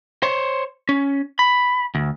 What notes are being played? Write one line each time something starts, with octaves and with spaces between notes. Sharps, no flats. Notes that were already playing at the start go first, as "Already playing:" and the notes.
C5 C#5
C#4
B5
D2